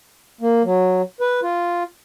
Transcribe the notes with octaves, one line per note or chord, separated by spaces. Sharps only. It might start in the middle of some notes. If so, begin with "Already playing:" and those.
A#3
F#3
B4
F4